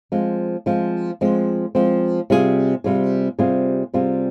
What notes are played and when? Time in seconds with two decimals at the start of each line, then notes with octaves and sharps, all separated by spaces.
0.12 F3 G#3 C4
0.66 F3 G#3 C4
1.21 F3 G#3 C4
1.75 F3 G#3 C4
2.30 C3 G3 C4 F4 G#4
2.84 C3 G3 C4 F4 G#4
3.39 C3 G3 C4 F4 G#4
3.94 C3 G3 C4 F4 G#4